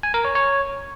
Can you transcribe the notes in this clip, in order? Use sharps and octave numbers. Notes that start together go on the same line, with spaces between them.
G#5
A#4
C#5
C#5